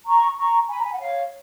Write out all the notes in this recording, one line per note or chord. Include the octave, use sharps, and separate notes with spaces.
A#5 C#6
A#5 C#6
G#5 B5
A#5
G#5
F#5
C#5 F5